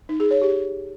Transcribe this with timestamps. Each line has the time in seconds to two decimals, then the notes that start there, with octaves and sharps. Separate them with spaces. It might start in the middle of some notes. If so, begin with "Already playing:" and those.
0.09 D#4
0.20 G#4
0.31 C#5
0.42 G4